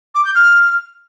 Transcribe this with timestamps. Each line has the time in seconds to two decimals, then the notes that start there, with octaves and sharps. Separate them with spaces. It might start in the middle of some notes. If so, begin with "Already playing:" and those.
0.15 D6
0.25 G6
0.35 F6